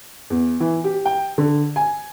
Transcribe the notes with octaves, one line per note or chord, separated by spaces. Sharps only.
E2
E3
G4
G5
D3
G#5